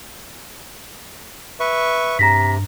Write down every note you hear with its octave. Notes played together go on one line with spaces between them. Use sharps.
B4 E5 C#6
G2 C3 A#5 A#6 B6